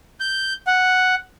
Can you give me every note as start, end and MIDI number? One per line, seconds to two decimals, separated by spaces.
0.20 0.53 91
0.67 1.15 78